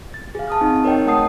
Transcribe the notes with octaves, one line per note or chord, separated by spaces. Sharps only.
A6
G#4 F5
A5 D#6 F6
C4 D#4
A#4 C#5 D#5 G5
A3 A#4 F#5 A5 D#6 C7